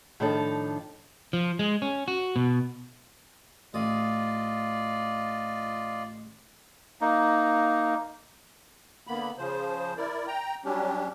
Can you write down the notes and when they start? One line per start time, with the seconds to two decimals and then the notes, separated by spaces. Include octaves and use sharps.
0.20 A2 D#3 F3 D4 D#4 A4
1.33 F3
1.59 G#3
1.82 C#4
2.08 F#4
2.36 B2
3.74 A1 F4 D5 D#5 D#6
7.01 A#3 D#4
9.07 D3 A#3 B3 B5
9.38 C#3 F3 C5
9.97 E4 A#4 D5
10.27 G5 A#5
10.65 F#3 G3 C#4 D4 G4